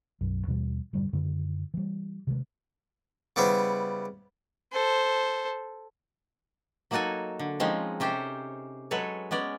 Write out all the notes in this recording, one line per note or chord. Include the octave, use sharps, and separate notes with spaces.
B1 F#2
D#2 B2 E3 G3
E1 G2 D3 G3
F#2 D3 D#3 G#3
E3 G3
C3 D#3 F3 G#3
C#3 G3 B3 E4 C5
A4 C5
F#3 A#3 D#4 F#4 A4 G#5
D3
F3 G#3 C4 C#4 D#4
C3 C#4 G4 A4 C5
F#3 G#3 A4 B4 C#5 A5
G#3 B3 C#4 D5